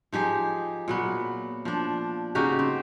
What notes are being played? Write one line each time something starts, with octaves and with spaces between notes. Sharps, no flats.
F3 D#4 G4 G#4
A#2 F#3 B3
F3 D4
C#3 D#4 F#4 G4
C4